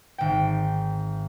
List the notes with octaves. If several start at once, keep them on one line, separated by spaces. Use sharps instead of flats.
G#1 G5